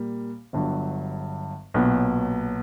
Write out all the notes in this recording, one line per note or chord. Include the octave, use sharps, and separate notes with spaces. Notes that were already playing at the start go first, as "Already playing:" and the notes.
Already playing: A#2 G3 A#3
G1 G2 F#3
B1 A#2 F#3 B3